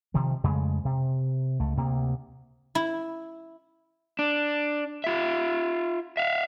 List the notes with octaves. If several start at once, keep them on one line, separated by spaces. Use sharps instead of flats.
C3 D#3 F3
F2 C#3 G#3 A3
C3
C#2 A3
D2 C3 A#3
E4
D4
F4 E5
E5 F5